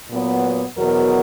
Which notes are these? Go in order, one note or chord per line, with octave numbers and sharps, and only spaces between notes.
A#2 F#3 B3
E2 B2 F#3 B3 A#4